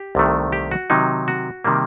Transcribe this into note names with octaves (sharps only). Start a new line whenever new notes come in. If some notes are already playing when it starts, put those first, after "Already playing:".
Already playing: G4
C2 C3 D#3 A3
G4
F#4
C3 D#3 F#3 D#4
F#4
C3 D#3 G3 A#3